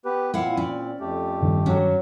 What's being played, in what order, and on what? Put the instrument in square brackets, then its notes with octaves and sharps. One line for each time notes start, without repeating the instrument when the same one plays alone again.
[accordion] B3 G4 B4
[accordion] A#2 C4 [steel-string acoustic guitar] E4 F5 F#5
[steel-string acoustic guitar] C#4 D5
[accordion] F2 A3 G4
[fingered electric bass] G2 D#3
[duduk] F#3 [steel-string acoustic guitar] C#4 F#4